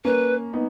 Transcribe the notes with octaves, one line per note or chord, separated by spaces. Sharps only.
A#3 C#4 B4
B3 D#4